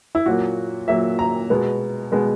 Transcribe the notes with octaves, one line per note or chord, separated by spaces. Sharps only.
E4
A#2 F#3 A#3 F#4
A#2 F#3 A#3 E5
A#5
B2 G#3 B3
B2 G#3 B3